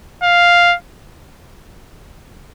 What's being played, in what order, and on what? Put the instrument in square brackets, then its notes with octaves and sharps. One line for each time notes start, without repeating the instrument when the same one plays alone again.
[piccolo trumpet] F5